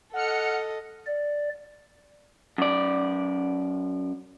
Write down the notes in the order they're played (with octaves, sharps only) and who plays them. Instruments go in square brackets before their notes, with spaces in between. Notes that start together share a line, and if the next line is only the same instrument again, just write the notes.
[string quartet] A4 D#5 [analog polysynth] F#5 F6 C#7
[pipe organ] D5
[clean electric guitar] F#2 D5